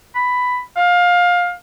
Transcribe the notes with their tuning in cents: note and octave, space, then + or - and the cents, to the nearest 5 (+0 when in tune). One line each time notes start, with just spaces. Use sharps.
B5 +10
F5 +20